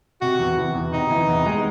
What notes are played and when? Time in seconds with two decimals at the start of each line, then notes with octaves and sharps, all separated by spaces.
0.21 C3 F#4
0.40 E2
0.57 E3
0.75 E2
0.93 C3 D#4
1.10 E3
1.28 E2
1.46 G#3